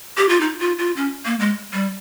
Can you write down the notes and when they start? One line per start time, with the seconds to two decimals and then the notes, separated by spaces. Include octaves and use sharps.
0.18 G4
0.29 F4
0.41 D#4
0.59 F4
0.78 F4
0.97 C#4
1.26 A#3
1.40 G#3
1.73 G3